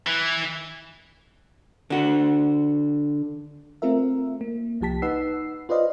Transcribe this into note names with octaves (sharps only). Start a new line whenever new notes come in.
E3
D3 F#4
A3 C4 F4 A#4 E5
A#3
C2 F3 G4 A5 B6
D#4 B4 F#5 E6 C7
F4 B4 C5 D5 D#5 F5